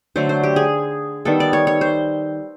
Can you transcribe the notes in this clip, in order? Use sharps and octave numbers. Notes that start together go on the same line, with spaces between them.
D3 F#3 A3 C5
C5
G4
G#4
D#3 G3 B3 A4
D5
C#5
C#5
C5